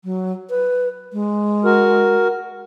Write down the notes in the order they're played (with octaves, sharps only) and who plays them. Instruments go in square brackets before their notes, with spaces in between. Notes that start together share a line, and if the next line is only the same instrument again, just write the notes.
[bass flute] F#3
B4
G#3
[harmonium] F#4 A#4